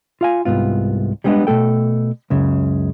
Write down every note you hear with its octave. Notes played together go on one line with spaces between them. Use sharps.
F4 F5 G#5
C2 F2 G#2 B3 F4
G3 G#3 A#3 B3 D4 D#5
B2 F#3 A3 A4 G5
C#2 F#2 C#3